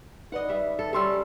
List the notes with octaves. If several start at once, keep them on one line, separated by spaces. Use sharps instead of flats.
D#4 B4 D5 D#5 F#5
G3 E5
A4
G3 C#4 G4 A4 C6 E6